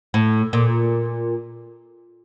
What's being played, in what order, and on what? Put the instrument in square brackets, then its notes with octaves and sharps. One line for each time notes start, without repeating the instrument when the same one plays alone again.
[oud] A2
A#2